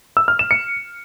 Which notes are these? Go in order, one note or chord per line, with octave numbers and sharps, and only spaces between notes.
E6
F6
E7
C#7